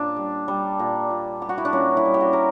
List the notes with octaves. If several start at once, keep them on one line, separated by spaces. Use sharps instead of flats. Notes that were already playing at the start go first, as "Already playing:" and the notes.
Already playing: A#2 D4
G3
G3
A#2
A#2
G3 G4
F#4
E4
D4
A#2 C#4
E4
G3
G4
F#4
A#4